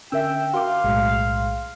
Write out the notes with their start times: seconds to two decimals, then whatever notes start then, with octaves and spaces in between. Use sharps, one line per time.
0.12 D3 C#4 A#4 E5 G5 E6
0.54 F#4 A#4 F5 C6 D6
0.84 B1 A2 G#3